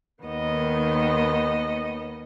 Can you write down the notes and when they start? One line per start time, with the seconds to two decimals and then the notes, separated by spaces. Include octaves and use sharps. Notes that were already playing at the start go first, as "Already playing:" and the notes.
0.23 D#2 D#3 B3 D#5